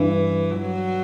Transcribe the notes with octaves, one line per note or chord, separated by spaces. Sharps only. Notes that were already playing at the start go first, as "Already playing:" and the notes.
Already playing: G2 E3
F#3